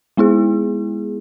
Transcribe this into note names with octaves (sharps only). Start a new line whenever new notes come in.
G#3 B3 E4 G#4